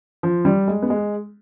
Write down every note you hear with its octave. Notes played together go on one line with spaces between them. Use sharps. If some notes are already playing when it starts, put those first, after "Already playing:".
F3
G3
G#3
B3
G#3